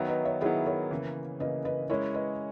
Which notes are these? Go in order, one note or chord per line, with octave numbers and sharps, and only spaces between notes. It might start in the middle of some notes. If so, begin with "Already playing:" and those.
Already playing: D#3 F#3 B3 C#5 E5
B4 D#5
C#5 E5
D#3 F#3 B3 E4 G#4
A#4 C#5
C#3 E3 A#3
C#3 E3 A#3 B4 D#5
B4 D#5
G#3 C#4 E4 A#4 C#5
B4 D#5